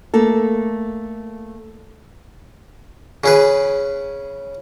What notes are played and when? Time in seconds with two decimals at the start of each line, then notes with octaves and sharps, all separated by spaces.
0.14 A3 A#3 A4
3.24 C#3 G#4 B4